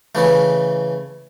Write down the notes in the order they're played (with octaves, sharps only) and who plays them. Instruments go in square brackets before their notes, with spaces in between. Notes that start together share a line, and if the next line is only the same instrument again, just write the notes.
[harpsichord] C#3 E3 A3